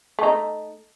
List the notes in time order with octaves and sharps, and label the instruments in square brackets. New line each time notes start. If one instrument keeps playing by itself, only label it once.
[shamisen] A3 D#4